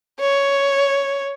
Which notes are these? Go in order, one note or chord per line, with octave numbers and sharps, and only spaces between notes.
C#5